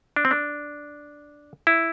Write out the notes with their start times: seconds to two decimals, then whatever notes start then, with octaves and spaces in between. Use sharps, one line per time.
0.16 D4
0.25 C4
0.31 D4
1.67 E4